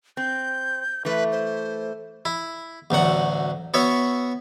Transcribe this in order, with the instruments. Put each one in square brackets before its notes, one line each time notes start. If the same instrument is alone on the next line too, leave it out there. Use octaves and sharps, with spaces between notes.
[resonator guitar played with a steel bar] C4 [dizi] G6
[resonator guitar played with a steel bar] E3 A3 [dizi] B4
[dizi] C5
[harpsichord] E4
A1 D2 F#3 F#5
B3 F#4 C#5 E5